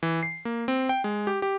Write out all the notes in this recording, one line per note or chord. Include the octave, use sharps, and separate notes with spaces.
E3
C7
A#3
C4
G5
G#3
G4
G4